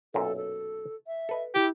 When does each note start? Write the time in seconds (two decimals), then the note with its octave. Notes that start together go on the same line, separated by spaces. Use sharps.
0.14 B1 F#2 A#2 A4
0.37 A4
1.07 E5
1.29 A4 B4 D#5
1.55 E4 G4